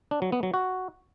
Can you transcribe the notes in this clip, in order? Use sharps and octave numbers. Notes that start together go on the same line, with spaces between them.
D4
F#3
B3
F#3
F#4